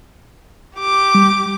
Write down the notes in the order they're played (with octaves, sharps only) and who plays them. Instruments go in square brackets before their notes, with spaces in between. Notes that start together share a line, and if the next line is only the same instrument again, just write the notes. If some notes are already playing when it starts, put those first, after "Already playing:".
[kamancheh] G4 D6
[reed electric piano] G3